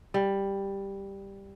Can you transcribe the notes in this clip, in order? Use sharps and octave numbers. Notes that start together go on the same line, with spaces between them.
G3